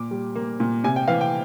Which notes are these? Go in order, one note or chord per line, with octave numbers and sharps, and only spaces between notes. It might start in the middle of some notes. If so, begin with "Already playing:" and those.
Already playing: A#2 D6
G3
A#3
A#2
C3 G#5
G5
E3 F5
G5